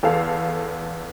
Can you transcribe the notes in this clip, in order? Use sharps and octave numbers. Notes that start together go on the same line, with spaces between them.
E2 A4 F5